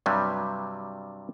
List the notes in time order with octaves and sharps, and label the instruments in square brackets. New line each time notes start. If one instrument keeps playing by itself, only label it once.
[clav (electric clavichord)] G2 C3 F#3 G3